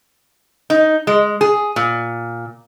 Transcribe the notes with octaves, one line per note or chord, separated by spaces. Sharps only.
D#4
G#3
G#4
A#2